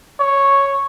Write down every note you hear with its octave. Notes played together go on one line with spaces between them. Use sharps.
C#5